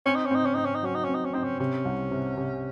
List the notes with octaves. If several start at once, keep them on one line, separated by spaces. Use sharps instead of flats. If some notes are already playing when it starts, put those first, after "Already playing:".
C4 C#4
D#4
C#4
C4 D#4
C#4
C4 D#4
C#4
D#4
F#3 C#4
D#4
C4 C#4
D#4
C#4
C4 D#4
C#4
C3 C#4
C2
C3
C3